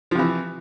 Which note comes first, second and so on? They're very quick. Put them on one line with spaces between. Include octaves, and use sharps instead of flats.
F3 C3 E3